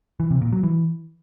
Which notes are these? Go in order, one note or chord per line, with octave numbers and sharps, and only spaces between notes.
E3
C3
A#2
F#3
E3